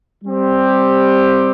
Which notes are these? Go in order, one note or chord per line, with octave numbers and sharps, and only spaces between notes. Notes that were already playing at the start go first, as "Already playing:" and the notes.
G3 C4 G4